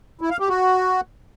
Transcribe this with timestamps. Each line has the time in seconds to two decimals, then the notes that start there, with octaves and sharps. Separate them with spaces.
0.21 E4
0.31 F5
0.40 G4
0.49 F#4